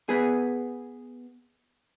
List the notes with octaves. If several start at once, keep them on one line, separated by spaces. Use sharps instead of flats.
B3 G#4